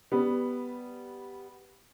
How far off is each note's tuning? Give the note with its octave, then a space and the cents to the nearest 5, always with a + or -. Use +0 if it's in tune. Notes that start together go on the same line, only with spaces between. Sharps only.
G3 +0 B3 +0